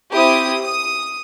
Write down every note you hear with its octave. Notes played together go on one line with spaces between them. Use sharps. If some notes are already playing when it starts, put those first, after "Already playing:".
C4 E4 G4 D#6
D#6